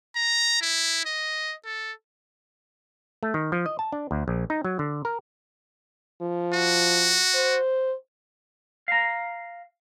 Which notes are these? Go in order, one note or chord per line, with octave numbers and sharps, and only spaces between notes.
A#5
E4
D#5
A4
A3
D#3
F3
D#5
A5
D4
D2
A#1
D#4
F#3
D3
A#4
F3
F#4
C5
F5 A#5